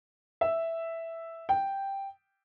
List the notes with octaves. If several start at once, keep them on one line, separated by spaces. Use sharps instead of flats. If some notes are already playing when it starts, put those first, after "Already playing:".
E5
G5